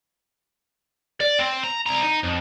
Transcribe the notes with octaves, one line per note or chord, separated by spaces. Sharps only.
D5
C4
A#5
C2 A#5
D#4
F2